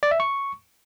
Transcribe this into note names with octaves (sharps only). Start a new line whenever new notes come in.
D5
E5
C#6